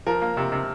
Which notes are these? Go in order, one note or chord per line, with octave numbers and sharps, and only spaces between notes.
F3 A#4
A#3
C3
C3